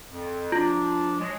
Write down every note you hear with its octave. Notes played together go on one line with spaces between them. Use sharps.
F2
F3 D4 F4
F#3 G#3